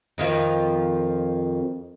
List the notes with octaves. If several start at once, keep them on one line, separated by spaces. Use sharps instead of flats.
F2 D#3 F3